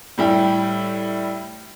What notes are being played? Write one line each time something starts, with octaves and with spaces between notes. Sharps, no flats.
A2 G3 E4 G5